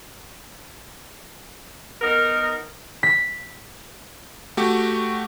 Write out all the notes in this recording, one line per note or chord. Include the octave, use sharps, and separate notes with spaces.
B3 D#4 A#4
B6
A3 F#4 G4